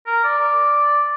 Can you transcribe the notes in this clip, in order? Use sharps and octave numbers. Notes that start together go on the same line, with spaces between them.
A#4
D5